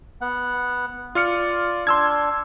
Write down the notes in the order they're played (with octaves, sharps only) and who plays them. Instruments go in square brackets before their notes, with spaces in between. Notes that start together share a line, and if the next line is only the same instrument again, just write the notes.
[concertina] B3 F#5
[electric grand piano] F4 F6 C#7 [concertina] D5
[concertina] D4 [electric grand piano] C6 E6 G#6